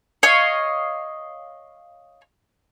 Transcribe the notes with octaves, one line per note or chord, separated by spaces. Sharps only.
C#5 D#5 F5 D#6